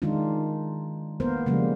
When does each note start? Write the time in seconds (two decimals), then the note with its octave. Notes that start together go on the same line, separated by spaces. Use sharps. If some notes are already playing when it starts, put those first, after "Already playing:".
0.02 D#3 G#3 D4 D#4 F4
1.20 A#3 B3 A#4 C5
1.46 C#3 F3 G3 G#3 A#3